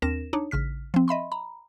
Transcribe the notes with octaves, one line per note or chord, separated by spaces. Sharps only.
D#2 C4 D4 A#4 A#6 E7
D4 D#4 C#5
A1 C#3 F6 B6
F3 C4
D#5 E5 B5 C6
A#5 B5